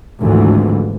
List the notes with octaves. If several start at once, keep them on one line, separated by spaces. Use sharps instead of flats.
G#1 D2 G#2 D3 E3 F3